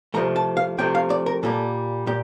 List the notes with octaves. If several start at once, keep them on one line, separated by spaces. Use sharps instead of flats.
C2 C3 F3 A3 A#5
A5
F5
C2 C3 F3 A3 G5
F5
D5
A#4
A#2 G3 A#3 A4
A#2 G4